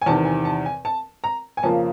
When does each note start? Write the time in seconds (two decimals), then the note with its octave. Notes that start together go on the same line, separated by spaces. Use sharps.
0.02 G#5
0.06 E2 C3 D#3 A5
0.25 G#5
0.45 A5
0.66 G#5
0.85 A5
1.24 A#5
1.57 G#5
1.63 F2 C#3 F3 A#3 A5